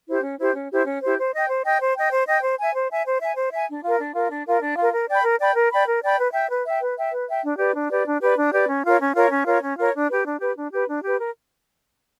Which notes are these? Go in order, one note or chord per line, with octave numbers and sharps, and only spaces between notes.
E4 G4 C5
C#4
E4 G4 C5
C#4
E4 G4 C5
C#4
E4 G4 C5
C5
D#5 G5
C5
D#5 G5
C5
D#5 G5
C5
D#5 G5
C5
E5 G#5
C5
E5 G#5
C5
E5 G#5
C5
E5 G#5
D4
F4 A#4
D4
F4 A#4
D4
F4 A#4
D4
F4 A#4
A#4
D5 G5 B5
A#4
D5 G5 B5
A#4
D5 G5 B5
A#4
D5 G5 B5
B4
E5 G5
B4
E5 G5
B4
E5 G5
B4
E5 G5
D4
G4 B4 D5
D4
G4 B4 D5
D4
G4 B4 D5
D4
G4 B4 D5
C#4
F4 A#4 C#5
C#4
F4 A#4 C#5
C#4
F4 A#4 C#5
C#4
F4 A#4 C#5
D4
G4 B4
D4
G4 B4
D4
G4 B4
D4
G4 B4
A#4